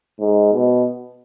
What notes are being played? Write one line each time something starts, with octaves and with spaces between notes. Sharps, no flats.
G#2
B2